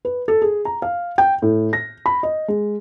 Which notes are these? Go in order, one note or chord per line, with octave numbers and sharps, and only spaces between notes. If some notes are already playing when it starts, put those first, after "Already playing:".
B4
A4
G#4
A#5
F5
G5
A2
A#6
B5
D#5
G#3